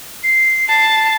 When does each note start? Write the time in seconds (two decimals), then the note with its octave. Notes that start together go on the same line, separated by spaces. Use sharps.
0.23 C7
0.69 A5 C7